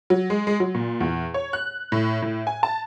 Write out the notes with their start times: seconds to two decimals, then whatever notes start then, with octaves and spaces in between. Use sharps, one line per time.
0.10 F#3
0.30 G#3
0.47 G#3
0.60 F#3
0.75 A#2
1.00 E2
1.34 C#5
1.53 F#6
1.92 A2
2.22 A2
2.47 G#5
2.63 A5